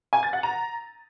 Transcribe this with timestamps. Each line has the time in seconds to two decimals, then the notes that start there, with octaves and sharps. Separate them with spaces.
0.13 G#5
0.23 A6
0.33 F#5
0.43 A#5